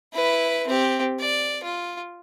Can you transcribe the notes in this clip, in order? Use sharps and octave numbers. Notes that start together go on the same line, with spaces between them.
E4 B4
C4 G4
D5
F4